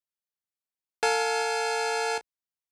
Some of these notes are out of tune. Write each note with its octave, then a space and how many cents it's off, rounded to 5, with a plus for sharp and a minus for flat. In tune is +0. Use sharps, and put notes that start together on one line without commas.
A4 +40 F5 +20 G#5 +30